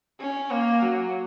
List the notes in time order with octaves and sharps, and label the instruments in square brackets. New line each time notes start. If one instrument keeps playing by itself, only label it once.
[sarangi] C#4
A#3
F#3